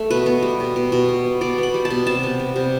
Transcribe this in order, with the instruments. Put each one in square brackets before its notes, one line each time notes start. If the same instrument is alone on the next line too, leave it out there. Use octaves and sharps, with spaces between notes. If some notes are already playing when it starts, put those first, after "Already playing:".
Already playing: [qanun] A3
B2 B4
B3
G3
B2
B2
B2
B3
B3
B2 D5
B3
B5
G3
A5
B2
C3 A5
B3
G3
C3